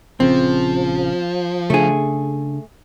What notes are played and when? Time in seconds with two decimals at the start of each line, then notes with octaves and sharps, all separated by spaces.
0.20 A#1 C#3 F3 C4
1.70 C#3 A3 D4 G#4